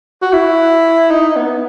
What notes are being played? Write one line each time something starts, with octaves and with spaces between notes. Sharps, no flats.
F#4
E4
D#4
B3